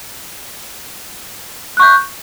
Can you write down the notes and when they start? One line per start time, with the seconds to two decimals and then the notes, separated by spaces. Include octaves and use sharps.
1.77 F#6
1.80 C#6
1.82 G6